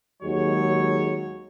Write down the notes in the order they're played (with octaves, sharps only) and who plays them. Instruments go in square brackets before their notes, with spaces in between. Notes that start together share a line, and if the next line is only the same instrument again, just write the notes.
[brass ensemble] D#2 F#3 G#3 C#5